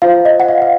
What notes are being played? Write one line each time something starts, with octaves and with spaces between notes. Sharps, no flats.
F4 C5 F5
D#5
F#5
F5
F5